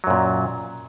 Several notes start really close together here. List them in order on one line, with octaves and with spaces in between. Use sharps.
F#3 F#2 A#2